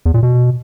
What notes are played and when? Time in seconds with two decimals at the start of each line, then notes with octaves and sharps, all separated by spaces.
0.05 E2
0.14 A#2
0.23 B2